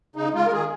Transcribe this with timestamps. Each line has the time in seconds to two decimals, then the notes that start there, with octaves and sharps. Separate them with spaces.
0.16 C#3 D#4
0.34 G#3 F4
0.47 A#4
0.52 D#3 G#4